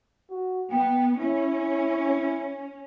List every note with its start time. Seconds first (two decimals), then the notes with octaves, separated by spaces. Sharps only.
0.30 F#4
0.72 B3 G5
1.19 C#4 E4